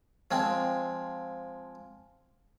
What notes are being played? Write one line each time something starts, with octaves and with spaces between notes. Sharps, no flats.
F3 G#3 C4